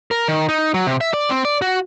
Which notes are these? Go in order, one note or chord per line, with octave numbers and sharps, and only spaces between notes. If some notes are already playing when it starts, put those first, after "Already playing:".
A#4
D#3
D#4
F#3
C3
E5
D5
C4
D5
F#4